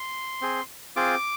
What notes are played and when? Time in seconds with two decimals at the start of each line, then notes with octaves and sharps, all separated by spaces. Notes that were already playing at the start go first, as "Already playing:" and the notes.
Already playing: C6
0.41 C4 G#4
0.96 C4 F4 G#4 D6